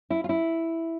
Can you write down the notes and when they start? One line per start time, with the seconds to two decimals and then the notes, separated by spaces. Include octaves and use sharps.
0.10 E4
0.24 F4
0.29 E4